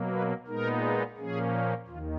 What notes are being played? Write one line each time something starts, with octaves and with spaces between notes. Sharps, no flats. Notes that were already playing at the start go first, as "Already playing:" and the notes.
Already playing: B2 F#3 A#3
B4
A#2 G#3 B3 D#4 A#4
A#2 F3 A#3 C#4 G#4
D#2 D#3 F4